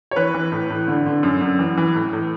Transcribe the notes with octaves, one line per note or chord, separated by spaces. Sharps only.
C#5
E3 B4
E3
A2
A2
D3
D3
F#2
F#2
E3
E3
A2
A2